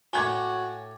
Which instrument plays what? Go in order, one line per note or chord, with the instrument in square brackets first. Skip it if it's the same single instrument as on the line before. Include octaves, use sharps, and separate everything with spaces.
[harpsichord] A2 C#5 [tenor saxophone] F#4 [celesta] G#5 [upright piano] D6 G#6 G7